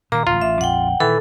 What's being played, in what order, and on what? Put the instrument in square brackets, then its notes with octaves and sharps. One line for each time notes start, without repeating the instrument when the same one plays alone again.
[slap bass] A#2 D#3 [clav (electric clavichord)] A#3 [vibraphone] A#5
[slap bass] D1 A1 [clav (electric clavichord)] F4
[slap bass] A1 [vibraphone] E5
[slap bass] A#1 F2 [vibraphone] F#5 G5
[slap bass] A#2 D#3 [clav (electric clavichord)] E3 [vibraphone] A4